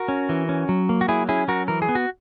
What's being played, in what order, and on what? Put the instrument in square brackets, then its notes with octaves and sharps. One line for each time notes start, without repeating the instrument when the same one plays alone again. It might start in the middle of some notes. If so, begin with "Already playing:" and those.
Already playing: [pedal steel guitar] F#4 A#4
C#4
E3
C#4
F#3
A#3
F#4
F#3 E4 G#4
C#4 E4 G#4
F#3 F#4 A#4
E3 A#4
G#4
B3
F#4